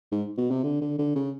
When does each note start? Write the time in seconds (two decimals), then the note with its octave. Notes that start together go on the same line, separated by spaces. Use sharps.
0.12 G#2
0.38 B2
0.51 C3
0.64 D3
0.81 D3
0.99 D3
1.15 C#3